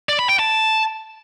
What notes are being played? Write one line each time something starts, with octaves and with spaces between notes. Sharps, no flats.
D5
B5
G5
A5